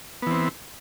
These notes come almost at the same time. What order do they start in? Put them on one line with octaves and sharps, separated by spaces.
B3 E3 C4